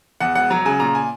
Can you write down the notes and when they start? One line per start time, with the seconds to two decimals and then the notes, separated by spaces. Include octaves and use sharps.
0.20 E2 F#5
0.35 E1 F#5
0.50 F#3 A#5
0.65 C#3 G#5
0.80 A#2 A#5
0.95 G#5